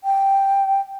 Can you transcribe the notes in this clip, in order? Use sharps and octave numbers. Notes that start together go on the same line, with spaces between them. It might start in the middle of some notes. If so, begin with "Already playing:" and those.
G5